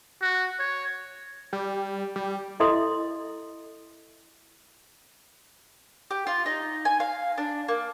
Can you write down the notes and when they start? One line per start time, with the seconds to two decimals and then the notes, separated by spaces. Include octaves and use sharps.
0.21 F#4
0.59 C#5
1.53 G3
2.16 G3
2.60 E4 A4 D#5 E5 C6 D#6
6.11 G4
6.27 F4
6.46 D#4
6.85 G#5
7.00 F5
7.38 D4
7.68 A#3